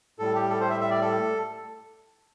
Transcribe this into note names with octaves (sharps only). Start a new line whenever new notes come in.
A2 G3 A4
G4
A4
C5
E5
E5
D5
A4